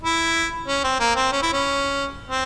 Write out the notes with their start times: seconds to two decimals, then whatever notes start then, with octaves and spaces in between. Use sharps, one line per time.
0.03 E4
0.68 C#4
0.84 C4
1.00 A#3
1.16 C4
1.32 C#4
1.42 E4
1.53 C#4
2.29 C4